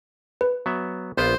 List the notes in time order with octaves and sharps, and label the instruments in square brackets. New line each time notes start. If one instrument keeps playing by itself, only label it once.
[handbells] B4
[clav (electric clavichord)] F#3 B3 E5
[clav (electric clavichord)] A#1 B3 F4 [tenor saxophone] C5